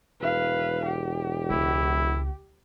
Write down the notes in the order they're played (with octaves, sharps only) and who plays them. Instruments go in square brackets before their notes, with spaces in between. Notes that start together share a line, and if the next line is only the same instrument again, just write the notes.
[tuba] E1 [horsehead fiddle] B4 F5
[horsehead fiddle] G4
[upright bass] C#2 [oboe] E4